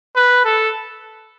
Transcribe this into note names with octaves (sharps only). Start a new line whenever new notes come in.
B4
A4